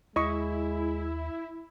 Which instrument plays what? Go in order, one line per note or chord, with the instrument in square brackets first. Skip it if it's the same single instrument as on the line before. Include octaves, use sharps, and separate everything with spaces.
[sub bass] D#2 [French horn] G#3 [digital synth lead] E4 [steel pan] D#5 C#6